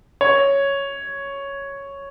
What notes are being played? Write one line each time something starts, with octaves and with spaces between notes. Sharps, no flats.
C#5